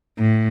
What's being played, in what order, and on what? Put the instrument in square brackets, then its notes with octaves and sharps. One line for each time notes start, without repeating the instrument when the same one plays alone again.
[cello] A2